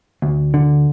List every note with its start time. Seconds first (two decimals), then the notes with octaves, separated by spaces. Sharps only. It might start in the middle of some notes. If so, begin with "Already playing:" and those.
0.22 D2
0.54 D3